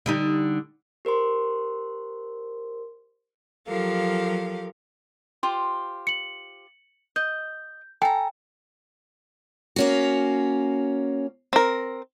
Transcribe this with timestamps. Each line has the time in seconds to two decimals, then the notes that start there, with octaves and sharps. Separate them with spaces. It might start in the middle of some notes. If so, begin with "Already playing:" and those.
0.06 D3 G3 D#4
1.05 G4 A#4 C5 C6
3.68 F3 F#3 G4 A4 A#4 F5
5.43 F4 G4 C5
6.07 C#7 F#7
7.16 D#5 G6
8.02 A4 G5 G#5 A#5
9.76 A#3 C#4 F#4
11.53 C4 A#4